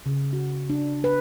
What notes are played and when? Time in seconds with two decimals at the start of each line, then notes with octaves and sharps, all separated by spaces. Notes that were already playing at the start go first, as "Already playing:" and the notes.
0.06 C#3
0.33 F#4
0.70 D4
1.04 B4